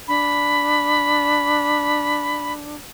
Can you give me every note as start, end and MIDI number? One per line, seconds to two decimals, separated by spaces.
0.08 2.76 62
0.08 2.53 83